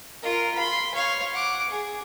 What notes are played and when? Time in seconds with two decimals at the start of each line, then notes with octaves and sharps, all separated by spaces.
0.22 F4 A#4
0.55 B5 C6
0.95 C#5 F5
1.34 F#5 D6
1.70 G#4